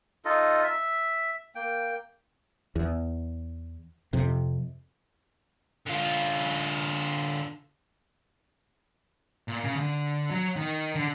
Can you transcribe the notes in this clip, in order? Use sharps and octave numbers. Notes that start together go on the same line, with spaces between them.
D#4 F4 A4 D#5
E5
A#3 G5
E2
F2 C3
D3 F4
A#2
C#3
D3
F#3
D#3
D3